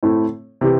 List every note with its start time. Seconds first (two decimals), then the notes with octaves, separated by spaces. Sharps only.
0.03 A2 A3 C4 E4
0.61 C3 E3 C4 G4